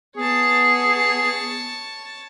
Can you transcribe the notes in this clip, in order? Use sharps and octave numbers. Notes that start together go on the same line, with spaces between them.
B3 G#4 C#5 A5